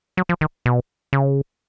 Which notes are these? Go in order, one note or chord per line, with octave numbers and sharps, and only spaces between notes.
F#3
F3
D#3
B2
C#3